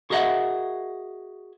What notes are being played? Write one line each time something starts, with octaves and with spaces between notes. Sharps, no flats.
F#4 G#4 A#4 D#5 E5 F#5